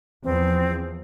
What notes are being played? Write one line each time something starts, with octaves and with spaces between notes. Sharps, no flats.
E2 F3 C4